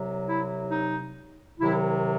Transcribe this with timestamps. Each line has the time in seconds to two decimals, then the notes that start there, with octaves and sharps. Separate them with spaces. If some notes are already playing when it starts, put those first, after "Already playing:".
Already playing: C2 C3 F#3
0.26 E4
0.71 D#4
1.59 C2 C3 D#3 F#3 E4